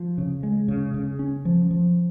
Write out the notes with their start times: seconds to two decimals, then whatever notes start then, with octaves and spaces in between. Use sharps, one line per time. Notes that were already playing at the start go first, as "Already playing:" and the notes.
Already playing: F3
0.18 C#3
0.43 G#3
0.68 C#3
0.94 C#3
1.19 C#4
1.45 F3
1.71 F3